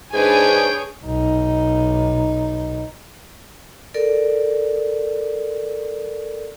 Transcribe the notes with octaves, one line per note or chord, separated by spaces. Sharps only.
G#2 D4 G#4 B4 C#5 G5 G#5
B1 D#4
A4 A#4 D5